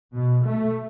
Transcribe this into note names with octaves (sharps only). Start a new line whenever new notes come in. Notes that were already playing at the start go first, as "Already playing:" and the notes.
B2
A3